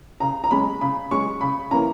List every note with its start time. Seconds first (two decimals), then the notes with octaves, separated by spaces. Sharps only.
0.20 C#3 A#5
0.44 A#5
0.51 G#3 C#4 B5
0.81 C#3 B5
1.11 G#3 C#4 C#6
1.41 C#3 B5
1.71 E3 A#3 C#4 A#5